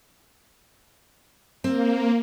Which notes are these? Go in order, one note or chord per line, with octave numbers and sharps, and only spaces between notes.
A#3 C4